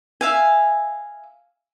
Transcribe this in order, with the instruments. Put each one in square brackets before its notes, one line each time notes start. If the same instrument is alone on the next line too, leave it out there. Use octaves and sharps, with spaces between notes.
[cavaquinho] E5 F5 G#5